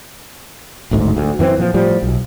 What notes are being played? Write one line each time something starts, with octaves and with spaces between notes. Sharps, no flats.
D1 G#1 D2 G#2
D2
F#2 E3 B3 C4
A#2 F3
A2 F3 G3
B1